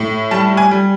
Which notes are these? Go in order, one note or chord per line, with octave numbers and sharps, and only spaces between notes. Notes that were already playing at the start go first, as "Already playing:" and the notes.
Already playing: A2
G3 A5
G#5
G3